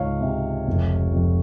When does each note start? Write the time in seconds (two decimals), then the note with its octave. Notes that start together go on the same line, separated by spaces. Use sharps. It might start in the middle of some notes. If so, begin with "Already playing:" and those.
Already playing: C#2 G#2 C#5 F5
0.21 C3
0.67 F1
1.13 F2